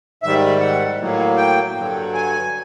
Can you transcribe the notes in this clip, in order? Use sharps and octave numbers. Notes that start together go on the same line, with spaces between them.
G#2 D#3 G3 E5
F#5
A2 F#3 A#3
G5
G2 D3 F#3
G#5